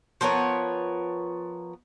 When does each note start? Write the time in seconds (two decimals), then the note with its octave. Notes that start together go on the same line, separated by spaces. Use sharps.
0.21 F3 B3 A#4 C#5